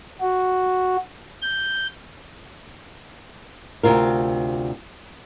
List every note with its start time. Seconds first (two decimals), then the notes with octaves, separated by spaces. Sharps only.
0.21 F#4
1.42 G6
3.83 D2 G2 C3 F4 A#4